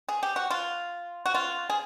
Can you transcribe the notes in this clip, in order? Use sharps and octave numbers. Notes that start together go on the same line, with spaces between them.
G#4
G4
F#4
F4
F#4
F4
G#4